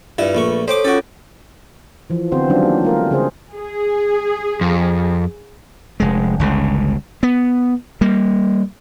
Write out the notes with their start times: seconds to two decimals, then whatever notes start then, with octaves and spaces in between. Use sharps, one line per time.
0.18 G2 E4 F4 B4 E5
0.35 A#1 A3 C#6
0.68 A4 C5 C#5 G5 D6
0.85 C#4 F4 F#4 A4 D7
2.10 E3 F3
2.32 D3 B3 C4 F4 F#4 C5
2.50 D#3 F#3 G3 C#4 D4 F4
2.65 A#3
2.85 A3 F4 A#4
3.11 C#3 G#4 C5
3.54 G#4
4.61 F2
6.00 F1 G#3
6.40 G1 C#2 C#3
7.23 B3
8.01 G3 A#3